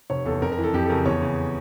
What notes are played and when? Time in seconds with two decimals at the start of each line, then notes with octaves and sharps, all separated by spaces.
0.10 F1 C#5
0.25 E2 A4
0.42 F2 A#4
0.52 A#4
0.58 E3
0.63 A4
0.74 F2 G4
0.85 A4
0.90 C#3 A#4
1.06 E2 C#5
1.22 C#3